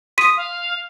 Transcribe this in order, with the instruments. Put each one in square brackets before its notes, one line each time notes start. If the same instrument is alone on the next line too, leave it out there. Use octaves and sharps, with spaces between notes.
[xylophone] C6 B6 D#7 [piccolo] D#6
[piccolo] F5